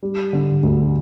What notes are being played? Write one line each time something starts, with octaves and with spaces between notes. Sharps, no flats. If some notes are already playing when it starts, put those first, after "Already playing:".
G3
D3
D2